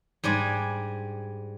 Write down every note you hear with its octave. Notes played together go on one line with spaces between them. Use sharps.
G#2 G3 D4 G#5